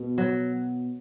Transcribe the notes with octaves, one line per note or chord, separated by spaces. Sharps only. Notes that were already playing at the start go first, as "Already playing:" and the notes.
Already playing: B2
F#3